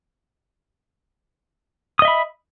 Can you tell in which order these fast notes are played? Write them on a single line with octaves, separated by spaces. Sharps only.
D#6 D#5 E5 B5